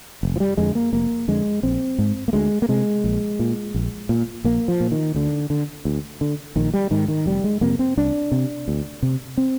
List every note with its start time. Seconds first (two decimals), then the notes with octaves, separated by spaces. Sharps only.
0.23 F1
0.36 F3
0.40 G3
0.57 F2 D3 G#3
0.75 A#3
0.93 F1 A#3
1.28 F2 D3 G#3
1.63 A#1 C4
1.98 G#2
2.28 A#3
2.33 D2 G#3
2.62 A#3
2.69 C3 G#3
3.04 A#1
3.39 A#2
3.74 A#1
4.09 A#2
4.44 A#1 A#3
4.68 F3
4.80 A#2
4.91 D#3
5.15 D2 D3
5.50 D3
5.85 D2
6.21 D3
6.56 A#1 D#3
6.74 G3
6.91 G#2 D#3
7.08 D#3
7.26 F1 G3
7.44 G#3
7.61 F2 C3 A#3
7.79 C4
7.97 C2 D4
8.32 C3
8.68 D2
9.03 C3
9.37 C4